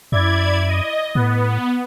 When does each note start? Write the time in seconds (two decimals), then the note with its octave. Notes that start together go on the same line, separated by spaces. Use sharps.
0.12 F#2 E4 D5 G#6
0.68 D#5
1.15 A2 B3